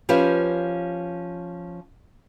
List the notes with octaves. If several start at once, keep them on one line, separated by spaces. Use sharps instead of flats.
F3 C#4 G4 B4 F5